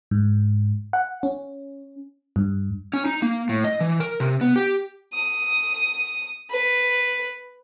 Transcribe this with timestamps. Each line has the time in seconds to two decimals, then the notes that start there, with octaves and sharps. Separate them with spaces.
0.11 G#2
0.93 F#5
1.23 C#4
2.36 G2
2.93 C#4
3.06 D#4
3.22 A#3
3.49 A2
3.64 D#5
3.81 E3
4.00 A#4
4.20 C3
4.41 B3
4.56 G4
5.14 D#6
6.50 B4